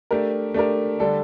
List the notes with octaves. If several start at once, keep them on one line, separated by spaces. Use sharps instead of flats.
A3 D4 G4 A#4
A3 D4 G4 A#4
D3 G3 D4 A4